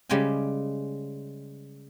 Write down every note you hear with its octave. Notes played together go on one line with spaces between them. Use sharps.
C#3 G3 G#3 G5 G#5